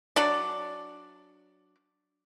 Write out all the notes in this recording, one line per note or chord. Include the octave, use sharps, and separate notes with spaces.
F#3 D4 D5